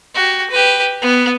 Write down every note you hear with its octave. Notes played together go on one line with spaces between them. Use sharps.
F#4 G4
G4 B4
B3